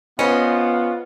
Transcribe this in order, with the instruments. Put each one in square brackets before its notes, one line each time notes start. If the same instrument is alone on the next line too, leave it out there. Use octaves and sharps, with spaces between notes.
[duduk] B3 [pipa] C#4 [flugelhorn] F4 [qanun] B4 C5 D#5